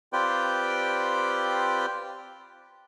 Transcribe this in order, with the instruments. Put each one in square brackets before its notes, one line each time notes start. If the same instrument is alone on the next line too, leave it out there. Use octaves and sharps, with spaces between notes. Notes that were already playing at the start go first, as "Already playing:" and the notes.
[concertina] C4 F4 G4 B4 D5 G5